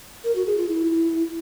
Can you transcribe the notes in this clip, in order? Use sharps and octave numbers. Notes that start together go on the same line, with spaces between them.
A#4
F#4
G#4
F4
E4